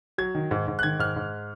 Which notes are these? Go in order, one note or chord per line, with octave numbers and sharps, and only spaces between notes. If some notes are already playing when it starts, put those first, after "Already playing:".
F#3 G#6
D#3
G#2
G#2
F#6
D#3 G#6
G#2 F6
G#2